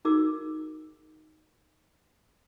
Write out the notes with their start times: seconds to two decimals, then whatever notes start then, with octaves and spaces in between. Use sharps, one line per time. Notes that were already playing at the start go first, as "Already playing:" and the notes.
0.05 D#4 F#4 G#4 A#4 D6 E6